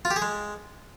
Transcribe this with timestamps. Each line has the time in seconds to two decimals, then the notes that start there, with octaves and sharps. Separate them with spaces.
0.05 F4
0.11 G4
0.16 G#4
0.22 G#3